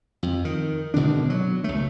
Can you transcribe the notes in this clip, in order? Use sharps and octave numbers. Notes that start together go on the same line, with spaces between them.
F2
D#3
G#1 B2 D3 D4
F#3
C#2 A3